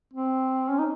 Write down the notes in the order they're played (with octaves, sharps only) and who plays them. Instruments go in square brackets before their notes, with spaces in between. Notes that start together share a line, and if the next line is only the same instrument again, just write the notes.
[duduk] C4
C#4
D#4